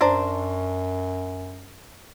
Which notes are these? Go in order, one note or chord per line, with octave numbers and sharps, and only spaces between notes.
F#2 D4 C5 A#5